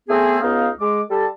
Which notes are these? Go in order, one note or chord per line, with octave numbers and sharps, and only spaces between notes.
A3 B3 C4 G#4
C#2 B3 D#4 F5
G#3 D6
G3 A4 A5